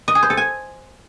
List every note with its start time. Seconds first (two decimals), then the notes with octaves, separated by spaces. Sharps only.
0.08 D#5
0.15 G#4
0.23 C5
0.30 A4
0.37 G#5